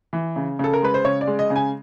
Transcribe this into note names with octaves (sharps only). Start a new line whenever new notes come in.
E3
C#3
C#3 A4
A#4
G#3 B4
C5
C#3 C#5
D5
G#3
D#5
C#3
G#5